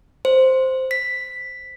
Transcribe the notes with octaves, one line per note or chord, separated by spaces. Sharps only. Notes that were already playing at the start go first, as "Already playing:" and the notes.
C5
B6